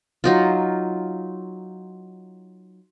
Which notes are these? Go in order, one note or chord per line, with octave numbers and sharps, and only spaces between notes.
F#3 D#4 F4